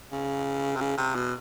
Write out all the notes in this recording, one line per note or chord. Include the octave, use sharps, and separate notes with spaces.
C#3
C3
C#3
C3
B2